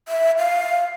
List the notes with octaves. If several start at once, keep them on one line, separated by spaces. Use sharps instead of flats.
E5
F5